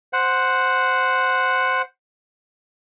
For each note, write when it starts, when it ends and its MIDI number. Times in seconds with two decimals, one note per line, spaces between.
0.13 1.82 72
0.13 1.82 78